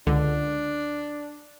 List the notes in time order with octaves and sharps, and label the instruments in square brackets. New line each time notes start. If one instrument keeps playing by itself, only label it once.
[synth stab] C#2 D3 [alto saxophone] D4